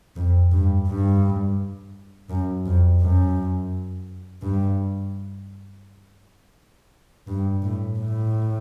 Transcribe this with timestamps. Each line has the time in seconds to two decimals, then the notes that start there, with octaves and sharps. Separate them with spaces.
0.16 F2
0.52 G2
0.87 G2
2.29 F#2
2.65 F2
3.00 F#2
4.42 G2
7.27 G2
7.63 A2
7.98 A2